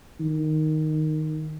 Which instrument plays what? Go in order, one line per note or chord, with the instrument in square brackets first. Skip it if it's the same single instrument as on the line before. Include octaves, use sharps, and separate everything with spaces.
[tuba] D#3